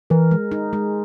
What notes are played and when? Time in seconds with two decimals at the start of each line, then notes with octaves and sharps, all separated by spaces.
0.10 E3 A#4
0.31 G#3
0.52 D#4
0.73 G#3